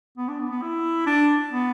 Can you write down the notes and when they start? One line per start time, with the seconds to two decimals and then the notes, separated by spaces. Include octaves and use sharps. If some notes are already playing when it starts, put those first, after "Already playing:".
0.17 B3
0.28 D4
0.40 B3
0.51 B3
0.62 E4
1.07 D4
1.52 B3